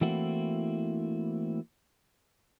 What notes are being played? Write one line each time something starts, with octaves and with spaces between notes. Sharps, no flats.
E3 A3 A#3 C4 E4 F#4